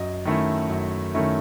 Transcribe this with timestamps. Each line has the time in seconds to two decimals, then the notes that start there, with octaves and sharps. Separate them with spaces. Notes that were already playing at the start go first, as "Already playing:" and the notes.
Already playing: F#2 D#5
0.25 D#3 A3 C#4 E4
0.69 F#2
1.14 D#3 A3 C#4 E4